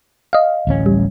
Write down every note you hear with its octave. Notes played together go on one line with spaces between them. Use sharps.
D#5 F5
D1 A1 C#4
G3